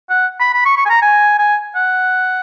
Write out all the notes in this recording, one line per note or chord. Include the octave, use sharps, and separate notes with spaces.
F#5
B5
B5
C#6
C#6
G#5
A#5
G#5
G#5
F#5